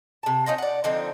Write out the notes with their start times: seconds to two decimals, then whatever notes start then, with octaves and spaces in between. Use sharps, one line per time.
0.23 C3 A5
0.46 C#4 D#4 F4 C5
0.58 D5 F#5
0.84 D3 F3 C4 D#4